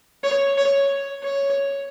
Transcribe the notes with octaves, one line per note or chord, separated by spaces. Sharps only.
C#5
C#5
C#5